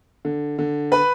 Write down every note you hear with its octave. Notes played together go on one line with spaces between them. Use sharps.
D3
D3
B4 B5